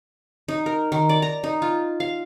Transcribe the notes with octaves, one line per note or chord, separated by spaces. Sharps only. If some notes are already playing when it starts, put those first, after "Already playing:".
D#4
A#4
D#3
D5
A#5
D#4
F4
F5